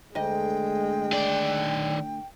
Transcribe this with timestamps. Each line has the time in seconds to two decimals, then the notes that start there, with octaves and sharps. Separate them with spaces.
0.15 D2 G#3 D#5 G5
1.12 D#3 D5